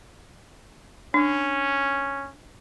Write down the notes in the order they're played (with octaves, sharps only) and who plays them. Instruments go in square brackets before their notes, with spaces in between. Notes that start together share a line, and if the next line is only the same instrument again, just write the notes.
[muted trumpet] C#4 [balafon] D4